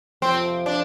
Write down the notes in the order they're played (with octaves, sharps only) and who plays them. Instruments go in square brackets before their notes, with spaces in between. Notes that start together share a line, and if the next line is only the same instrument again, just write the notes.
[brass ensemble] F2 C3 F3 [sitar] C4
[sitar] D4